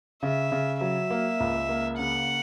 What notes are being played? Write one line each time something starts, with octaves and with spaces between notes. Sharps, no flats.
C#3 E5
C#3
F#3 E5
A#3
C#2
A#3
C#3 F#5